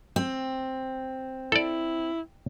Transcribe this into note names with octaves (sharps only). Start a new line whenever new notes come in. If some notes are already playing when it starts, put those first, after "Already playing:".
C4
E4 A4 D5